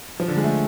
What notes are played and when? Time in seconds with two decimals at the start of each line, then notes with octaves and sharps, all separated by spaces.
0.20 F3
0.28 D3
0.37 G#3
0.44 A3